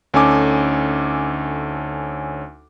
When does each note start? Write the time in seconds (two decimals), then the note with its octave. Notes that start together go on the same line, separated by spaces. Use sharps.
0.14 D2 C#4 D#4 A4 G#5 D6